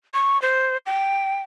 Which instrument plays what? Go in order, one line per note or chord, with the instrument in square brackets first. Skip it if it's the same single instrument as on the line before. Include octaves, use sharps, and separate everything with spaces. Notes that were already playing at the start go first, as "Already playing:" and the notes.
[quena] C#6
C5
G5